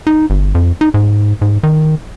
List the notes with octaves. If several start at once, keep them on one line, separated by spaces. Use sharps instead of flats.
D#4
G1
F2
D#4
G#2
G#2
D#3